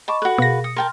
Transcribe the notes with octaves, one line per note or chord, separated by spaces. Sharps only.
D#5 A5 B5 C#6 D6
F#4 A4 B4 F#6
B2 G#4 A#4 F5 A#6
D#6 C#7
A#4 G5 A5 C6 F6